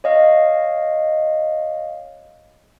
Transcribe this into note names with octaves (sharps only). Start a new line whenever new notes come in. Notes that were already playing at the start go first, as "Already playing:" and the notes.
C#5 D#5 F5